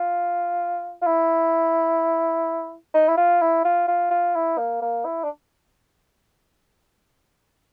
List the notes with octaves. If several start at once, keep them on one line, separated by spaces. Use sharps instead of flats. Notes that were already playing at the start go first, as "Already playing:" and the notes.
Already playing: F4
F4
E4
D#4
E4
F4
E4
F4
F4
F4
E4
A#3
A#3
E4
D4